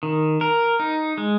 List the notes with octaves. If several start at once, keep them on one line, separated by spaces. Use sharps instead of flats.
D#3
A#4
D#4
G#3